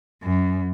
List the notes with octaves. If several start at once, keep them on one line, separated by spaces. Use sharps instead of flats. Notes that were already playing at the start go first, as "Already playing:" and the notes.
F#2